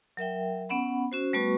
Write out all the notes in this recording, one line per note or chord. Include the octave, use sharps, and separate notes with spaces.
F#3 A#4 E5 G5
B3 C#4 F#5 B5
C#4 F#4 C5
G3 A3 B3 F#4 B4 C#6